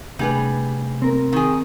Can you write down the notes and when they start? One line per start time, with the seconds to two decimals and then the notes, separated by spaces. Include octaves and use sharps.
0.19 C3 G3 A3 D4 G#4 B4
1.02 C4 A#4
1.33 D#3 G#4